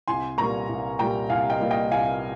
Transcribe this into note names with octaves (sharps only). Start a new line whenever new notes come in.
C2 G#5 C6
A#2 G3 A#3 A#5 C#6
C2
A#2 G3 A#3 G5 A#5
C2 F5 G#5
D#5 G5
A#2 G3 A#3
D#5 G5
C2 F5 G#5